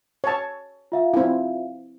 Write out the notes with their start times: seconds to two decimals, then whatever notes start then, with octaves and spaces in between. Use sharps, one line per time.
0.24 C#5 A5
0.92 F4 E5 F5
1.14 C4 E4